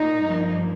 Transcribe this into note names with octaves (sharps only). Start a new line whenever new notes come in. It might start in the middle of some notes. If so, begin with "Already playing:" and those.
Already playing: A#2 D#4
G2 F3 A#3